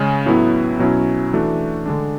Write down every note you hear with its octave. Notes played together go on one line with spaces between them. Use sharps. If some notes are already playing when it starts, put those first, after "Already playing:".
Already playing: C#3 G#3 C#4
A2 F#3 B3 E4
B2 F#3 C#4 E4
E3 A3 D4 F#4
D3 G#3 D4